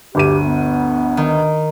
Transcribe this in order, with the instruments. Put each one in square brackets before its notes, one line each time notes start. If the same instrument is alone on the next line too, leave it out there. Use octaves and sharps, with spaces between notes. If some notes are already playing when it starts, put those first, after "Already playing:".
[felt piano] G1 D2 D#7 [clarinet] G4
[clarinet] B3
[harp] D#3